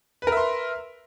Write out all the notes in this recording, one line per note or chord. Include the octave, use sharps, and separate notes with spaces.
A#4 B4 E5 C6